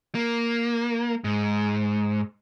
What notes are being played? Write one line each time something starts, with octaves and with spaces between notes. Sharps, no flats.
A#3
G#2